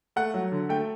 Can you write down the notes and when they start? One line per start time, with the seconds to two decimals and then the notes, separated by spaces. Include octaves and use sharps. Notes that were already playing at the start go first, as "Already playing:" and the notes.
0.16 A3 F#5
0.34 F#3
0.52 D3
0.69 A3 G5